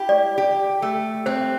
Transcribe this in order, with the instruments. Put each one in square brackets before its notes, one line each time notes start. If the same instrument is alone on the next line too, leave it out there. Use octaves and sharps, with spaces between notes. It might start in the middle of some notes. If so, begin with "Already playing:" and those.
Already playing: [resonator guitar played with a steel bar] E4 G4
[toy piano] D5
[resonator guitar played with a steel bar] G4
A3
[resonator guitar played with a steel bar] C4 [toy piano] C5